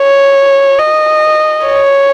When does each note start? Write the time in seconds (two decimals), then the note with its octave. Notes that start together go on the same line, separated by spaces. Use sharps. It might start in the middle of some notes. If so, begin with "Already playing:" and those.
Already playing: C#5
0.79 D#5
1.67 C#5